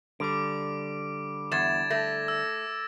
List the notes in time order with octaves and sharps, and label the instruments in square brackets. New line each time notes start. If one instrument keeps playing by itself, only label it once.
[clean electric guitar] D3 G3 [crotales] D6 D7
[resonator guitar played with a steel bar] E2 [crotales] G#6 A6 E7
[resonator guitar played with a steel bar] A3 [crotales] A#6
[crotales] E6